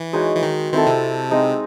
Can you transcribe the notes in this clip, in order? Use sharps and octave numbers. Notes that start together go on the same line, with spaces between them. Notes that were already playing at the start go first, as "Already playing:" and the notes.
Already playing: E3
G#3 D#4 F#4 C#5
E3
D#3
D#3 C4 E4 A4
C3
G#3 C4 D#4